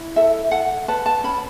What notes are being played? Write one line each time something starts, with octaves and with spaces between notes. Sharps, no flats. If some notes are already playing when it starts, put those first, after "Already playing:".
Already playing: E4
A4 E5
A4 F#5
B4 A5
A5
C#4 B5